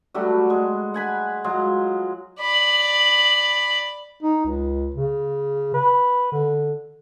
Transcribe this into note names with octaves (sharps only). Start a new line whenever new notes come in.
F#3 G3 A3 F#4
G#3
F#5 G#5 B5
F#3 G#3 F4
D5 B5
D#4
C#2
C#3
B4
D3